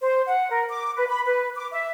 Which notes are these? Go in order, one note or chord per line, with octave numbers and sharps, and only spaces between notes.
C5
F#5
A#4
D6
B4
B5
B4
D6
E5